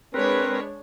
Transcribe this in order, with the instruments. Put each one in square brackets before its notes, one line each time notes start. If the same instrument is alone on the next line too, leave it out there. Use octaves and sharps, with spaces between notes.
[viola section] G#3 D4 C#5 [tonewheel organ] C4 A#4 [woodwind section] B4